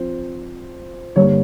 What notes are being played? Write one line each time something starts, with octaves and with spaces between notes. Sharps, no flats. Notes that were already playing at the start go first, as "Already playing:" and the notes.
Already playing: F3 C4 C5
G2 D3 G3 A#3 C#5